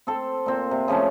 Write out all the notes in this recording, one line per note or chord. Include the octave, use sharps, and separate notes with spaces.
C4 A4
A#2 C4
C3
C#3 F3 A3 C#4